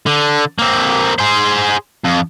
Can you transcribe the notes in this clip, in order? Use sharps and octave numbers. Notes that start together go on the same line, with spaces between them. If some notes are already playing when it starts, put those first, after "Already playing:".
D3
A#3 C4
G#4 C5
F2